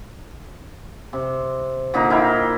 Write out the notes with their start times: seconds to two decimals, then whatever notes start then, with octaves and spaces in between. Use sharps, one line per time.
1.13 C3
1.94 A#2 D3 D#4 A#5
2.10 D#4 E4 F5 G5